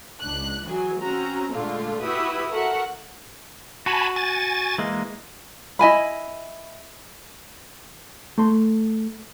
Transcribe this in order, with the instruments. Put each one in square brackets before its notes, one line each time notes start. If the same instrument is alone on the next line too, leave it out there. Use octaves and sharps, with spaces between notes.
[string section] C#2 D4 F#6
E3 F#3 G#4
C4 C#4 F#4 A#5
A#2 D3 G#3 A3 F4
E4 F#4 G4 B4 E5 D#6
F#4 A4 A#4 E5 F#5
[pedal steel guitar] F#4 [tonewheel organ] G#5 A5 B5
[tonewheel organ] G#5 A6
[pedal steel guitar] E3 G#3 A#3
[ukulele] E4 D#5 G#5 B5
[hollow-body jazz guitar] A3 C6